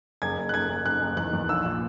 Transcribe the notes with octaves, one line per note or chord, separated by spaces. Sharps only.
F#1 G#6
F#1
F#6
F#1 G#6
F#1
F#1 F#6
F#1
E2 F#6
E2
A#1 E6
A#2